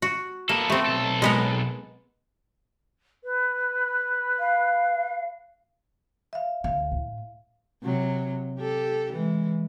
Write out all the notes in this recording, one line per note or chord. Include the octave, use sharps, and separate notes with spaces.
F#4
A#3 B3 A4
A3 C4
B1 A4
G#3 B3 A#4
B4
F5
E5 F5
D2 F5
A2
C3 F#3
G4 A4
E3 G#3